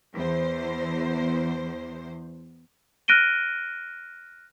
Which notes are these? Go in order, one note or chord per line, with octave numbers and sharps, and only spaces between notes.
E2 C5
F6 F#6 A#6 D7 D#7 G7